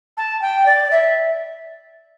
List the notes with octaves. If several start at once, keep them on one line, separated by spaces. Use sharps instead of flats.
A5
G5
D5
E5